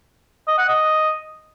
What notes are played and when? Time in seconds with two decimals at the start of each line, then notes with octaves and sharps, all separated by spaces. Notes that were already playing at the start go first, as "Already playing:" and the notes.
0.48 D#5
0.58 F#5
0.68 D#5